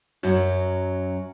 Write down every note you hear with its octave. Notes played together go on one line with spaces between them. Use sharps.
F#2 F#3